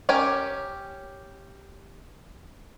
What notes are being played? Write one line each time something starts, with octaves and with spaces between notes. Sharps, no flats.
C#4 G4 A#4 C#5 G#5